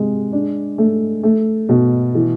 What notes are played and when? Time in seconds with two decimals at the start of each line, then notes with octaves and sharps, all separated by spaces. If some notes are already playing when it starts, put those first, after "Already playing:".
Already playing: C3 G#3
0.32 D4
0.78 A3
1.23 A3
1.69 B2
2.15 E3